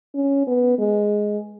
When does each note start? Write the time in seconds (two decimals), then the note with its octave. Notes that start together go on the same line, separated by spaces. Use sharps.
0.15 C#4
0.47 B3
0.78 G#3